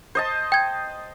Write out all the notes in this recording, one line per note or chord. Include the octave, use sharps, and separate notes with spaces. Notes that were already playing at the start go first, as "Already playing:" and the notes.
C5 D#5 A5
G5 G#6